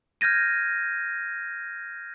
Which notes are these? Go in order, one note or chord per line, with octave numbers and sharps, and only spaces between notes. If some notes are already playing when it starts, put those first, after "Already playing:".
F6 G6 G#6 A#6 D#7